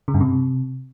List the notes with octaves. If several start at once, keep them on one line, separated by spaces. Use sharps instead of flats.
C#3
G2
C3